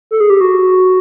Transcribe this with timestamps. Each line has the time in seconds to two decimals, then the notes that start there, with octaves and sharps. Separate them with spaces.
0.11 A4
0.20 G#4
0.30 G4
0.41 F#4